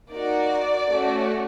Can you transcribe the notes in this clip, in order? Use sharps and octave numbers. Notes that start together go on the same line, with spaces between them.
A#3 D#4 F#4 D5
A3 C#4 F#4